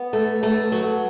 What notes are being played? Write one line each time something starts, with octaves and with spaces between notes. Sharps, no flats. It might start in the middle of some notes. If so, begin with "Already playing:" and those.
Already playing: B3
A3
A3
F#3